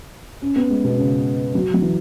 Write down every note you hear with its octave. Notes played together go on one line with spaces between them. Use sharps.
C#4
B3
G#3
B2
C#3
F#3
F#3
E3